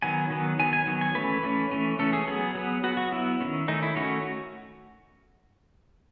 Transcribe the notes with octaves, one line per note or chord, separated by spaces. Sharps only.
D#3 F#3 B3 G#5
D#3 F#3 B3
D#3 F#3 B3 G#5
G#5
D#3 F#3 B3
G#5
E3 A3 C#4 B4
E3 A3 C#4
E3 A3 C#4
E3 A3 C#4 A4
G#4
F#3 B3 G#4
F#3 B3
F#3 B3 F#4
F#4
F#3 B3 E4
D#3 A3 C#4
D#3 A3 C#4 D#4
E4
D#3 A3 C#4 F#4